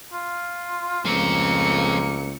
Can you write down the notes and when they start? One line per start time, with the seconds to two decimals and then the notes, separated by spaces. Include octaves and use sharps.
0.13 F4
1.06 C#2 F3 A3 A#3 C4 C#7